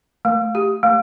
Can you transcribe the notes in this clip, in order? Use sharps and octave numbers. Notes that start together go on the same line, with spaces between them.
A3
G4
A3